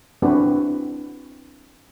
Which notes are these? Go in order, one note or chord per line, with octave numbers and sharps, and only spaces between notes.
C4 D4 E4 F#4 B4 C5